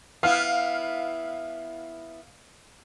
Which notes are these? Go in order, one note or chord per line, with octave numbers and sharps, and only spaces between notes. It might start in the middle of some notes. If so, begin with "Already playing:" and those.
B3 E4 F5 F6